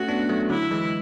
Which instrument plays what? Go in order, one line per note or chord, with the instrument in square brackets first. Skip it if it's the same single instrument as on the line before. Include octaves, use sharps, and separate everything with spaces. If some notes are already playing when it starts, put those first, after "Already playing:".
Already playing: [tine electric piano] A3 C#4 [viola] F#4
[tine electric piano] B3 D4
F#3 A3
[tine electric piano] D3 F#3 [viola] E4
[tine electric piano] E3 G#3